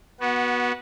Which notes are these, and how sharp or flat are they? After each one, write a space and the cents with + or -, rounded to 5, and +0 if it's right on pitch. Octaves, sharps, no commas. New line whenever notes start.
B3 -20 F#4 +0